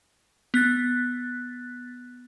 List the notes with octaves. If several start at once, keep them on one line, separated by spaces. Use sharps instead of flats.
B3 F#6 A6